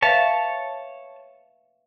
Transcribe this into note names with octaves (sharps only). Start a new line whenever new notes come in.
B4 C#5 E5 F5 A5